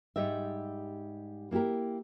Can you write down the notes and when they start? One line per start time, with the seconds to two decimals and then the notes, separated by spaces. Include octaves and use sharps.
0.16 G#2 G3 G4 D#5 E5
1.51 A#3 E4 F#4 G4 A#4